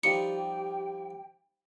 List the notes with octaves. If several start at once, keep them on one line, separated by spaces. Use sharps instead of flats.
F3 G3 D#4 G4 G5 C#7